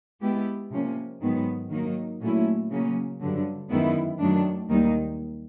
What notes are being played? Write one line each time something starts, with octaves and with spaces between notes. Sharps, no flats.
G#3 B3 E4 G4
C3 F3 A#3 C#4
G#2 D#3 F#3 B3
D#3 F#3 A#3 D#4
A#2 F#3 A3 C#4 E4
C#3 F#3 A#3 C#4
G2 D3 F#3
F#2 D#3 G#3 B3 E4
F#2 D#3 F#3 A3 D4
D#2 D#3 G3 A#3 D#4